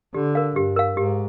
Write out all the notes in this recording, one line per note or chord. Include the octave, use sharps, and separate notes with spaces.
D3 G4
A#4 F5
G2 G4
A#4 F5
G#2 G4